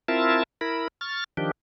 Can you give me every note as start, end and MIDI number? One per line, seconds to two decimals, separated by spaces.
0.08 0.43 60
0.08 0.43 64
0.08 0.43 65
0.08 0.43 70
0.08 0.43 76
0.08 0.43 81
0.61 0.88 64
0.61 0.88 70
0.61 0.88 83
1.01 1.24 85
1.01 1.24 89
1.01 1.24 93
1.37 1.51 51
1.37 1.51 53
1.37 1.51 62
1.37 1.51 67